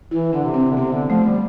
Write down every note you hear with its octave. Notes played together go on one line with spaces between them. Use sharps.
E3 E4
D3 D4
C3
C4
D3
C3 B3
D3
F3 A3
G3